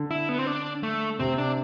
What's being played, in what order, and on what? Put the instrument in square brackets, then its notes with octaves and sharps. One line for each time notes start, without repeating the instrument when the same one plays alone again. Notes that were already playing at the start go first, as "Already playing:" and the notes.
Already playing: [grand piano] D3
[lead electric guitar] E4
B3
C4
D4
A3
[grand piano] C3 [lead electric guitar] C4
[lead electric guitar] D4